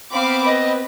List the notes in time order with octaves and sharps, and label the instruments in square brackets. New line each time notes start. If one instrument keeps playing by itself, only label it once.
[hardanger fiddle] B3 C4 [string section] F5 B5 D6
[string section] B4 [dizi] D#5